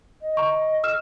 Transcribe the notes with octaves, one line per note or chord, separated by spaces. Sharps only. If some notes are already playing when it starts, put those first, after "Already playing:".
D#5
A#5 C#6
E6 F6 E7